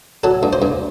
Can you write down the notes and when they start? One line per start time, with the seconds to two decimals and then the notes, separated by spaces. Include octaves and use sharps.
0.24 F#3 A4
0.43 G2
0.53 C5
0.62 G2